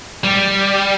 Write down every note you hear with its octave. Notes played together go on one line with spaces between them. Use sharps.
G3